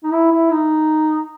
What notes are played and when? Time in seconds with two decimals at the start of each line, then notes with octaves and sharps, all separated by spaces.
0.04 D#4
0.12 E4
0.31 E4
0.51 D#4